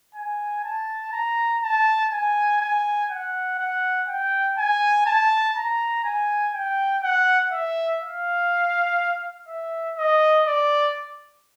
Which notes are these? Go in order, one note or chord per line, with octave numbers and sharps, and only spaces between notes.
G#5
A5
A#5
A5
G#5
G#5
F#5
F#5
G5
G#5
A5
A#5
G#5
G5
F#5
E5
F5
E5
D#5
D5